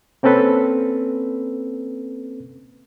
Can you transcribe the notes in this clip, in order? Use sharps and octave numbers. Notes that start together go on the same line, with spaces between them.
A#3 C4 C#4 A4 B4